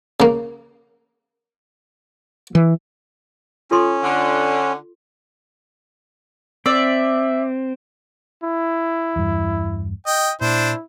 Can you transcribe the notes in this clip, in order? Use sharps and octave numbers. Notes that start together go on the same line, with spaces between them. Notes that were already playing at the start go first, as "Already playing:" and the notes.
C#3 A#3
E3
C#4 F4 A4 C6
D3
C4 D5 E5
E4
E2 G2
D#5 G5
A#2 D4 E4 C5